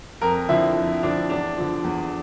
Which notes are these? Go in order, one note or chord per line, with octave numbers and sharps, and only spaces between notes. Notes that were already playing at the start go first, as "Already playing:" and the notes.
F2 A#4
D3 F3 E4
F2
D3 F3 D4
E2 D4
D3 F3
E2